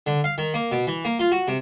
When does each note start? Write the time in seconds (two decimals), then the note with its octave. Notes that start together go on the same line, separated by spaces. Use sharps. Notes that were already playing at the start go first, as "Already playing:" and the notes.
0.07 D3
0.24 F5
0.38 D#3
0.54 A#3
0.72 B2
0.87 E3
1.05 A#3
1.19 F4
1.32 F#4
1.48 C3